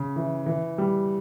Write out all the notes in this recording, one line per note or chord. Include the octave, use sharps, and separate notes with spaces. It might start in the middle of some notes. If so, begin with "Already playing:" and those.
Already playing: C#3
E3
E3
G3